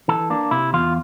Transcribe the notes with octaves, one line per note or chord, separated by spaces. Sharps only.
E3 A4
A#3 D4
C3 E4
E2 F4